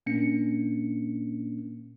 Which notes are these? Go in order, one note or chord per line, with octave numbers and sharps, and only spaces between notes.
A#2 A#3 C#4 D4 C#7